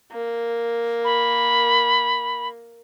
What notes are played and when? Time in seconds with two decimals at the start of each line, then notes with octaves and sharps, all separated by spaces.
0.13 A#3
1.04 B5